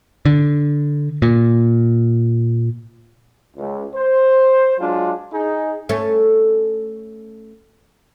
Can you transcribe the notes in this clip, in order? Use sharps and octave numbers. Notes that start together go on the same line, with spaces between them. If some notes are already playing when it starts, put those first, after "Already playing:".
D3
A#2
C#2
C5
F#3 G#3 D4 F4
D#4 G#4
A3 C#4